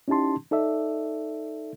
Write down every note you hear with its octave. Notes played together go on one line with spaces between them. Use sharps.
C#4 D#4 E4 G4 A5 C6
D#4 A4 D5 E5